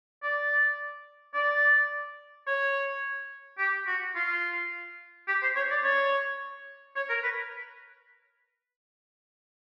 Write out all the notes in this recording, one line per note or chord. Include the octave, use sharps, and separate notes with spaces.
D5
D5
C#5
G4
F#4
F4
G4
C5
C#5
D5
C#5
C#5
A#4
B4